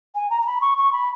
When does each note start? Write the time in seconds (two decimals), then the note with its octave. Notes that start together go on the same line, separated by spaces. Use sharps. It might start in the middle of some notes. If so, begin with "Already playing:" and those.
0.15 G#5
0.30 A#5
0.42 A#5
0.46 B5
0.61 C#6
0.78 C#6
0.93 B5